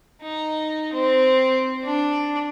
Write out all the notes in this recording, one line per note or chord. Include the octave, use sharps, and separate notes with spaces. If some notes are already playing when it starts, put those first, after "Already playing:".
D#4
C4
D4